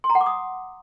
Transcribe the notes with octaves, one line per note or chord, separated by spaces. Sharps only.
C6
A#5
F#5
D6
D#6